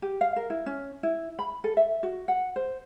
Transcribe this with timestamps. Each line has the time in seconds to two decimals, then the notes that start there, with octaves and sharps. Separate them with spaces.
0.02 G4
0.21 F5
0.36 A#4
0.50 E4
0.66 C#4
1.03 E4
1.39 B5
1.64 A4
1.77 E5
2.03 F#4
2.28 F#5
2.56 C5